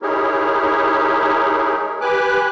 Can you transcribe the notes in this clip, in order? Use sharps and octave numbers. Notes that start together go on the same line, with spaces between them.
D#4 E4 G4 G#4 A#4 C#5
G4 B4 G#5 D6 F#6